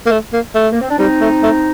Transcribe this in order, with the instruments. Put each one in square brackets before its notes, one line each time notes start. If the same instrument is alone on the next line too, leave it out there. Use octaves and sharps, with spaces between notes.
[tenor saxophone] A#3
A3
A#3
A3
[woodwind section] A#3
C4
D4
[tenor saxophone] G3 [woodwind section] C4 D#4
[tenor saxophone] A3
A3